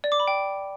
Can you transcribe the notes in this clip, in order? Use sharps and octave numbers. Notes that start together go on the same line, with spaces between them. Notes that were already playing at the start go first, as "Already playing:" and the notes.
D5
D6
B5
G5